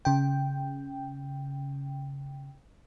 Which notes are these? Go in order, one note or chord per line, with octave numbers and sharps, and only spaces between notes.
C#3 G5